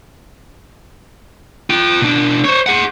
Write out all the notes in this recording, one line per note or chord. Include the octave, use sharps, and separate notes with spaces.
F4 G5
B2 D4
C5 C#5
G#4 F#5